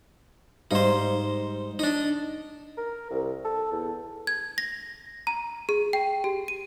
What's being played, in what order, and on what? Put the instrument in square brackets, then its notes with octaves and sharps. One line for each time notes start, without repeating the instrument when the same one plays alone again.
[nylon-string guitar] G#2 G3 F5 [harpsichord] D#4 C5
[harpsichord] D4 D#4
[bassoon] A#4
C2
A4
E2
[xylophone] G#6
A#6
A#5
G#4
G5
G4
D#7